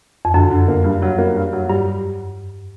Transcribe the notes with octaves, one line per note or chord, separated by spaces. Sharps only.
F2
F#2 D3
D3
A#3
G2
F#3
A#3
G2
F#3
G2 G3